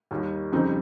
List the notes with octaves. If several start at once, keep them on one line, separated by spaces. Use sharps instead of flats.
D#2 D#3 G3
F2 C#3 G3 C4 D#4